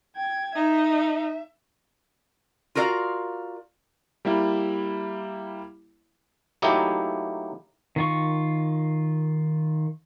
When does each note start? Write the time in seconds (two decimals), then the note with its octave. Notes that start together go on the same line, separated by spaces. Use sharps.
0.16 G5 G#6
0.56 D#4 E5
2.75 F4 F#4 A#4 D5 F5
4.25 G3 A#3 E4
6.62 F#3 A3 A#3 D#4 E4 G4
7.96 D#3 F4 C#6